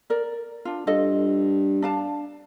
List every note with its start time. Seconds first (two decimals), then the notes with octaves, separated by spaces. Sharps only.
0.10 A#4 D5
0.65 D4 F4
0.87 G2 F4 A4 D#5
1.82 D4 F5 A5